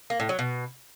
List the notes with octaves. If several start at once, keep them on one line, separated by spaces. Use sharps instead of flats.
A#3
A2
F#3
B2